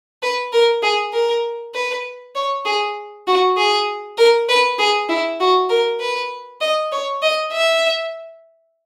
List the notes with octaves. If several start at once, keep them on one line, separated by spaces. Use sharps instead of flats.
B4
A#4
G#4
A#4
B4
C#5
G#4
F#4
G#4
A#4
B4
G#4
E4
F#4
A#4
B4
D#5
C#5
D#5
E5